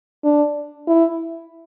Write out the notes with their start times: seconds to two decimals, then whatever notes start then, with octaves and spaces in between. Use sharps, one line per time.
0.24 D4
0.87 E4